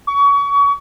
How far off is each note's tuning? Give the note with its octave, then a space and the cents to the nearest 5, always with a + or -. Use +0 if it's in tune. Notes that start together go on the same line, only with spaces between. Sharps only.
C#6 +30